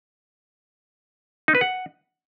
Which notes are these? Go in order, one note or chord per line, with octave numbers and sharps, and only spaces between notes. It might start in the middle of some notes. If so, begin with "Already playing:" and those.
D#4
B4
F#5